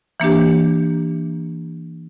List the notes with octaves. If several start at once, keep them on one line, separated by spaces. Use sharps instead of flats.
E3 A#3 D4 G4